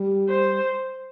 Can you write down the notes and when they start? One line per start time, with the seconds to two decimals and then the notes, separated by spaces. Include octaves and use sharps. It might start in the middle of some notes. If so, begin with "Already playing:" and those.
Already playing: G3
0.29 C5